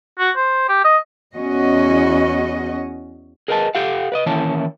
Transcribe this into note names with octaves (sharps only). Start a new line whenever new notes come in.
F#4
C5
G4
D#5
E2 C#4 F#4 D#5
G#4 A#4 B4 D#5 G#5 A5
G4 A4 F5 F#5
B4 D5 D#5
D#3 E3 A#3 C#4 E4 A5